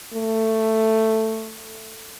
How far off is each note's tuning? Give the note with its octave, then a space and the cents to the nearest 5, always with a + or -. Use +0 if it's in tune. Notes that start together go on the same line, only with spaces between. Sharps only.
A3 +10